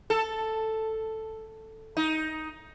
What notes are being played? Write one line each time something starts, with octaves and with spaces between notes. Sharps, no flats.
A4
D#4